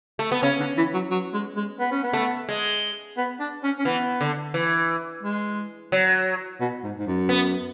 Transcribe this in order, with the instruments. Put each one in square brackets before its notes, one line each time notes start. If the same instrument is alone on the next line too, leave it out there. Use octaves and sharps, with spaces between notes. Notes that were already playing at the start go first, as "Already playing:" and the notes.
[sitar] A3
B3
[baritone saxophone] C#3 [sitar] C#4
[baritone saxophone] D3
E3
F#3
F#3
G#3
G#3
B3
C#4
B3
[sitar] A3
G#3
[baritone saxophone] B3
D4
C#4
C#4
[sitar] E3 [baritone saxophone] B3
[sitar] D3
E3
[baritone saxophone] G#3
[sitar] F#3
[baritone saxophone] B2
G#2
G#2
F#2
[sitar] B3